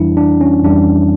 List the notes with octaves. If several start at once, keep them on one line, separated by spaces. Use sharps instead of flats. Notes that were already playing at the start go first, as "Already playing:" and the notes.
Already playing: F2 E3 G3 D4 E4
D4
C#4
F2 E3 G3 D4